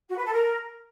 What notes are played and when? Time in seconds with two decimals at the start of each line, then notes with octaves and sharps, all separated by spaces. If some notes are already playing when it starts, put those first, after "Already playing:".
0.09 F#4
0.17 B4
0.25 A4
0.33 A#4